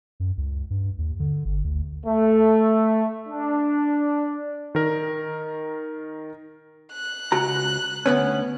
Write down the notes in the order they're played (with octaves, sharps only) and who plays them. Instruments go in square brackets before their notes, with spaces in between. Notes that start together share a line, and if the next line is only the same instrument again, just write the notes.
[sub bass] F#2
C#2
G2
D#2
D3
G1
D2
[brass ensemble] A3
D4
[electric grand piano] D#3 A#4
[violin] F#6
[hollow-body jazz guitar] C#2 F#4 A#5
D2 B3 C#4